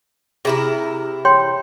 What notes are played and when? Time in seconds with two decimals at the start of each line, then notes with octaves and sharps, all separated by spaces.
0.45 C3 E4 G#4 A#4
1.25 C#5 G5 C6